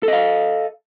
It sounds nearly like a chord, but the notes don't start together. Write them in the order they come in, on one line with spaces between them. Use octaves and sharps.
A4 D#5 F5